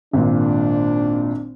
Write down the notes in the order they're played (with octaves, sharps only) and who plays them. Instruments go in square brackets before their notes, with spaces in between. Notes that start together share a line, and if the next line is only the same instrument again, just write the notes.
[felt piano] G#1 A#2 [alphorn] D4